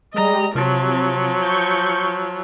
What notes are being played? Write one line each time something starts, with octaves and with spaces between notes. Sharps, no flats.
G3 G#3 D#5 A#5
C3 F3 F#3
C#6 G6